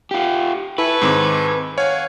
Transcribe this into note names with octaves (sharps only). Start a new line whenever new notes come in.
F4 G4
E4 A4 B4 G#5 C#6
G#2 D#3 C4 D6
C#5 F5 F#5 G#5